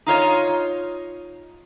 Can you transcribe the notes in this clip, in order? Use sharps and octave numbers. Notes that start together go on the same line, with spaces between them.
D#4 F4 C#5 D#5